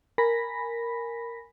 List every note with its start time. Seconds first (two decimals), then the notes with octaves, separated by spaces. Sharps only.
0.18 A#4 G#5 B5 A#6 B6